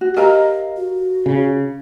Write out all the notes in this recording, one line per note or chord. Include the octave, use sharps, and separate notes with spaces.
F#4
G4 A#4 D#5 F5 A#5
F#4
C#3